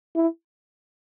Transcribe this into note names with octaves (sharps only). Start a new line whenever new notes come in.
E4